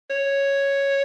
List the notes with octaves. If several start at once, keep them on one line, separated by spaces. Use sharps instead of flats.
C#5